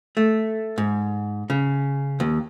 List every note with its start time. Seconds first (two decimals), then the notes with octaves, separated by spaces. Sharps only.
0.17 A3
0.78 G#2
1.50 C#3
2.20 D#2